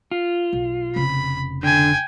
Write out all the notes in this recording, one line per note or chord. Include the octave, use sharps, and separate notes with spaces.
F4
B1
F1 C#3 B5
D3 G5 G#5